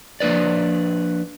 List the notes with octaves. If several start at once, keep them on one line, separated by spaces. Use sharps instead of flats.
F3 A#3 D4 B4 D5